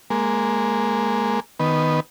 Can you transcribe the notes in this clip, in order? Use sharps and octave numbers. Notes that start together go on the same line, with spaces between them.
G#3 A#3
D#3 B3